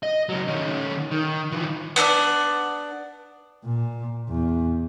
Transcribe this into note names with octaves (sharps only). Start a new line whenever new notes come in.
D#5
C#3 F#3
D#3 C#4
D#3
E3 F3
B3 D4 A4 D5
A#2
E2